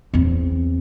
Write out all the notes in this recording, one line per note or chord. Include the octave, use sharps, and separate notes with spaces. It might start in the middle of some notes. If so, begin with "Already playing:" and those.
E2 C4